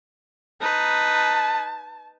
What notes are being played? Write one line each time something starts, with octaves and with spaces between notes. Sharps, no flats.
D#4 B4 A5